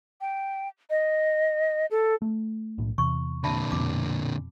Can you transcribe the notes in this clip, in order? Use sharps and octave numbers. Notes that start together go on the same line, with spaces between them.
G5
D#5
A4
A3
B1 A2
E2 C3 C#6
A#2 D3 E5 A5 B5
F2 B2 D6